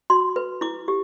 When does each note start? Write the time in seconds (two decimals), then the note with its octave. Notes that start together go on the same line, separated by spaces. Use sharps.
0.10 F#4 C6
0.36 B4
0.61 E4 D6
0.88 G4